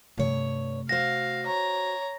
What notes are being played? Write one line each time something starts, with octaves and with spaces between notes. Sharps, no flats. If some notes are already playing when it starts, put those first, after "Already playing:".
G2 C3 A3 C#5
F#4 C5 F5 A#6
C#5 A#5